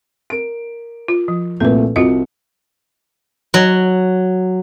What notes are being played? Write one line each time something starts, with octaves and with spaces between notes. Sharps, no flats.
A#4 D7
F4
F3
C2 A#2 A3 A4 B4
C2 F4 F#4 D#5 C#7
F#3